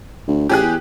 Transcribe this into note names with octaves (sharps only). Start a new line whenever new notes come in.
D2
A1 G4 G#4 F#6
E2